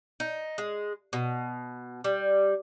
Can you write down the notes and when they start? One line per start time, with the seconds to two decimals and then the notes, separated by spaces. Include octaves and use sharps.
0.20 D#4
0.58 G#3
1.13 B2
2.04 G3